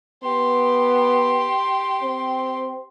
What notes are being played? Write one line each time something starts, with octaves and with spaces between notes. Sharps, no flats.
B3 G4 C6
C4